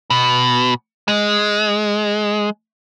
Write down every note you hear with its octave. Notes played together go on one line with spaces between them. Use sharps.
B2
G#3